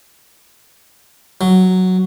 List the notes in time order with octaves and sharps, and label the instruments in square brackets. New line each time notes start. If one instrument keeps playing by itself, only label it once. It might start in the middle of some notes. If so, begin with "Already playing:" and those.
[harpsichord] F#3